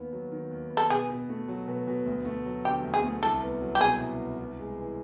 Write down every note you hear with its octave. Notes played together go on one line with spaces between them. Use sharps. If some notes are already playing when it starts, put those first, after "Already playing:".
Already playing: D#2 B3
F#3
D#3
D#2
B3
A4
B2 G#4
B2
A3
F#3
B2
B2
D2
A3
F#3
D3 G4
D2
G#4
A3
C2 A4
B3
F#3
G4
B2 G#4
C2
B3
C2
G#3
E3